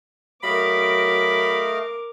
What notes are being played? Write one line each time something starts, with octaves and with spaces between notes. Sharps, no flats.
F#3 A3 A#4 D#5 F5 B5 D6